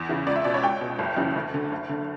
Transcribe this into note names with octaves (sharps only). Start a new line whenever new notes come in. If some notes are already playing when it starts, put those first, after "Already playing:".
Already playing: E2
C#3 E3
C#2 D5
E5
B2 D5
C#5
C#2 G5
B2
F#1
F#2 C#3 E3
D2
D3
F#1
D3